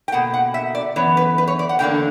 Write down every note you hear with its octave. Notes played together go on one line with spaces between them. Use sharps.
G5
B2 A#3 F#5
F#5
E5
D5
F#2 E3 B3 C#5
B4
B4
C#5
D5
F#5
E2 D3 A#3 D4 G5